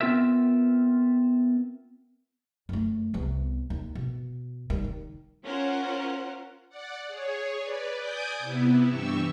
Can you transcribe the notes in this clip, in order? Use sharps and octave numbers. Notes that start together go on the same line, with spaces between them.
B3 C4 F4 A#4 E5
F#2 A3
C2 B3
D#2
B2
D#3 G3
D#3
C#4 F4 A#4 C5 F#5
D5 F#5
G#4 C#5
B4 D5
D5 G#5 D6 D#6 G6
C3 B3 E4
G2 E3 G4 C#6 E6